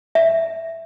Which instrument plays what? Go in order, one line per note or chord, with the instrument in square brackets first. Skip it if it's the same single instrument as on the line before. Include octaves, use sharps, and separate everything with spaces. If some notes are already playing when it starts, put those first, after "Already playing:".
[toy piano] E5